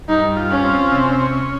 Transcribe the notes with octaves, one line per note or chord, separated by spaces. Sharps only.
G2 D#4
F4
C#4
C4
C3
C#4